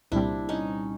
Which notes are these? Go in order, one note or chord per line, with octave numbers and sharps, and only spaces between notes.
C2 A#2 G3 C4 D4 E4
C#4 D#4